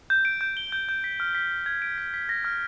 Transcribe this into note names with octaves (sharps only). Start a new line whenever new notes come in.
G6
D7
G6
G7
G6
G6
B6
F6
B6
F6
G#6
D7
B6
B6
A#6
F6